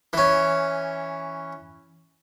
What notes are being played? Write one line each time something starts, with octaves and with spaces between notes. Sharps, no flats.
E3 C#4